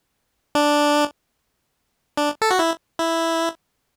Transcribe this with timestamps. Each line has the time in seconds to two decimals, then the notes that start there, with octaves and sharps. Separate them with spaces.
0.55 D4
2.17 D4
2.42 A4
2.51 F#4
2.59 E4
2.99 E4